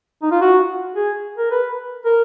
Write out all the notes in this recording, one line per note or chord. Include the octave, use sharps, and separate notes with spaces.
D#4
F4
F#4
G#4
A#4
B4
A#4